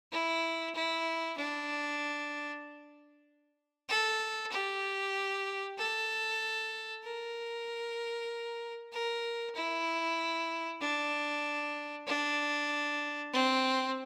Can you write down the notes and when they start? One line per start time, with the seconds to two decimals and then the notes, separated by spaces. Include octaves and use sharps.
0.12 E4
0.75 E4
1.37 D4
3.89 A4
4.51 G4
5.78 A4
7.03 A#4
8.92 A#4
9.55 E4
10.81 D4
12.07 D4
13.33 C4